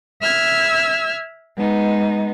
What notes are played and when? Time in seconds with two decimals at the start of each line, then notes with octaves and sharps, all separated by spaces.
0.21 E5 E6 F6 G#6
1.56 G#3 B3 D#4